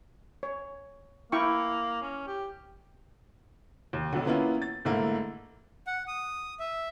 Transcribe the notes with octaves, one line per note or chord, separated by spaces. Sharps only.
C#5
A#3 E4 G5 C#6
C#4
G4
D#2
B1 B2 D3
E3 A#3 B3 C#4 E4 F4
A6
G#2 D3 A3 A#3 E4
F#5
D#6
E5